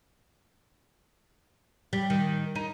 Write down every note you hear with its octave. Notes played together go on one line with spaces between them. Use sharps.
G3
D#3
D#4